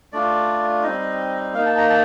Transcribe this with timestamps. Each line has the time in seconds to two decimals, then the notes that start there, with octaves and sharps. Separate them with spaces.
0.13 A3 D4 F4 D5
0.83 G3 C4 D#4 D#5
1.54 A#3 D#4 F5
1.66 A5
1.78 A#5
1.90 A5